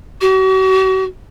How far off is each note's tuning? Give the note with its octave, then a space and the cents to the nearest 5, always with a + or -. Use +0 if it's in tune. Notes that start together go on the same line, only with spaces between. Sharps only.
F#4 +40